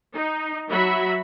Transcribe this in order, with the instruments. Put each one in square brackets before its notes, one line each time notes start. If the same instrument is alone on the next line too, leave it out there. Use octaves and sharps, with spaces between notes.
[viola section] D#4
F#3 F#4 E5 B5